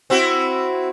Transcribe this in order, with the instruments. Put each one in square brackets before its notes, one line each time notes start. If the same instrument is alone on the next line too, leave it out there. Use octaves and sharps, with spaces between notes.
[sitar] C4 E4 F#4